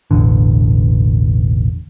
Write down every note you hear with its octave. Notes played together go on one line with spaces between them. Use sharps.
E1 A1 D3